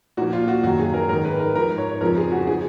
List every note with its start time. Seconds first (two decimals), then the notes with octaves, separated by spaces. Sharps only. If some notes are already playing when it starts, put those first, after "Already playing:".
0.17 A#2 F3 F#4
0.33 F4
0.48 F#4
0.63 F#2 D#3 F#4
0.79 G#4
0.94 A#4
1.09 G#2 A#4
1.13 D#3
1.25 B4
1.40 A#4
1.55 G#2 F3 A#4
1.78 C#5
2.01 F2 C#3 F3 A#4
2.17 G#4
2.32 F#4
2.47 F3 G#4